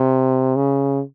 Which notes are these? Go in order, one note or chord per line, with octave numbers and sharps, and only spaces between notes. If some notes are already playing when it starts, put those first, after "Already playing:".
Already playing: C3
C#3